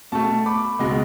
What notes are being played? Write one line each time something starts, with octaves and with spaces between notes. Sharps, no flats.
B2 A3 A5 C#6
B5 D6
C#2 B2 G#3